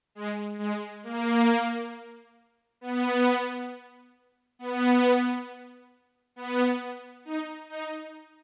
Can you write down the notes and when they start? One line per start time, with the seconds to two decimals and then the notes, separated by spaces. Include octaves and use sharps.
0.15 G#3
0.59 G#3
1.04 A#3
2.81 B3
4.59 B3
6.36 B3
7.25 D#4
7.69 D#4